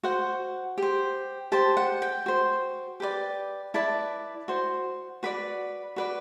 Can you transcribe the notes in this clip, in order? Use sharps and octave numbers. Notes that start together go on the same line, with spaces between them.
F#4 C5 F#5
G4 C5
G4 C5 A5
F#5
G5
F#4 C5
G4 B4 D5
E4 B4 D5 A5
F#4 C5
F#4 B4 D5 B5
F#4 B4 D5